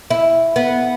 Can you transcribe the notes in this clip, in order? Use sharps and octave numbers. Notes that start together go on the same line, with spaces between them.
E4
B3